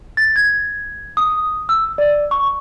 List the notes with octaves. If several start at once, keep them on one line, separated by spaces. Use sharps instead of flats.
A6
G#6
D#6
E6
D5
C#6